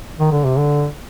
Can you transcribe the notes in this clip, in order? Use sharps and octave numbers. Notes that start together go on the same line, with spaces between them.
D#3
D3
C3
D3